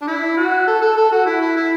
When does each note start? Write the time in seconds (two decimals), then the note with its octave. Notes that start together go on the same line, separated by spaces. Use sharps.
0.02 D4
0.07 E4
0.37 F#4
0.67 A4
0.82 A4
0.97 A4
1.12 F#4
1.26 E4
1.41 E4
1.56 E4